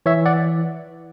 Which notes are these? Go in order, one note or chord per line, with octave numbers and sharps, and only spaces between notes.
E3 C#5 E5
D5 F#5